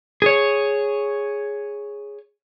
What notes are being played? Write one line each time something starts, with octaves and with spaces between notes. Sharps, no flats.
G#4 C#5